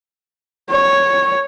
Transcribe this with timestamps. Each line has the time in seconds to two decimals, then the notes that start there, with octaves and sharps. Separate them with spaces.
0.70 C#5